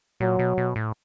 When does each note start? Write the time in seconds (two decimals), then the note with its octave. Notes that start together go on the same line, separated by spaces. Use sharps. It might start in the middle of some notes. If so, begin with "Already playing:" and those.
0.20 A#2 F#3
0.39 B2
0.58 B2
0.76 A2